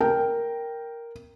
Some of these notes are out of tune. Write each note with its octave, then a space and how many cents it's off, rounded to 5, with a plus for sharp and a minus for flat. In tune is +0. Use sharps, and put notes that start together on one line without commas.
A#4 +0 G5 +0